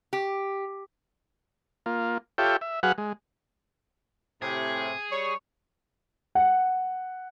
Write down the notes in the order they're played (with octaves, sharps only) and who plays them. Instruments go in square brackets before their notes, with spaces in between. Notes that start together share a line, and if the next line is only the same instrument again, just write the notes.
[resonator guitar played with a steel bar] G4
[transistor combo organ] A#3 F4
F4 G4 A4 C#5 E5 G5
E5
F#3 F#4 G#4 B4 F5 F#5
G#3
[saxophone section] A2 C3 [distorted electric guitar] G#4
[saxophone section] G3 C#5
[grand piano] F#5